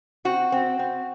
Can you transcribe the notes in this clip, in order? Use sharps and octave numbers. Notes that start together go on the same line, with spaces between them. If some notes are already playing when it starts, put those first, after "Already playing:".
C4 F#4
C4
C4